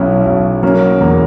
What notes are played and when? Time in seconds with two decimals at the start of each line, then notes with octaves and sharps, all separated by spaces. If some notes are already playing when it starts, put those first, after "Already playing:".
Already playing: B1 B2 C#4 E4
0.26 B1
0.62 F#3 A#3 C#4
1.00 E2 A#3